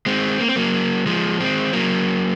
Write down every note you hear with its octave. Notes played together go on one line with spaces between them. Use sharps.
G#3 C4
A#3
C4
F#3 A#3
F3 G#3
G#3 C4
F#3 A#3